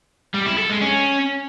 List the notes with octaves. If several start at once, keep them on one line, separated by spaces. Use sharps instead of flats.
G3
E4
A4
G#3
C#4